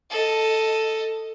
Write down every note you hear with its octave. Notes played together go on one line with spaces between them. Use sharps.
A4 D#5